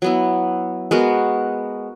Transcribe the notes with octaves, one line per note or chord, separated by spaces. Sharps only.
F#3 B3 E4
G#3 B3 F#4 A#4